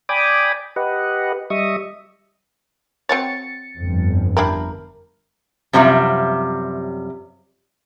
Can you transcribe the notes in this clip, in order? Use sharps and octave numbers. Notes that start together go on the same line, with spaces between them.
D5 G5 G#5 B5 D6 D#6
G4 B4 D#5 F#5
G3 D#5 E5 C#6 D#6
C4 F#4 C#5 A6 C#7
G1 F2
D4 E4 G4 A#4
F#2 C3 F3 G3 E5